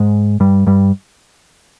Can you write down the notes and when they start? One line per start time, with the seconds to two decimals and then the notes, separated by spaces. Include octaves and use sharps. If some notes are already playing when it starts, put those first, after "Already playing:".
Already playing: G#2 G#3
0.40 G2 G3
0.67 G2 G3